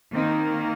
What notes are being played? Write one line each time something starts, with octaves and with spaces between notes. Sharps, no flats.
D#3 A#3 C4 D#4